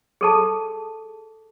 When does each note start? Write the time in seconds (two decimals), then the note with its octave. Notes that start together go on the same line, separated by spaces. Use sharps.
0.21 G#4 A4 A5